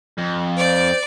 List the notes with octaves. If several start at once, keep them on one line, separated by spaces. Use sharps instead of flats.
F2
C5 D5 D6